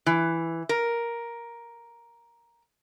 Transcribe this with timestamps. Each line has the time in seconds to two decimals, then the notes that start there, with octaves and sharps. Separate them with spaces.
0.06 E3
0.69 A#4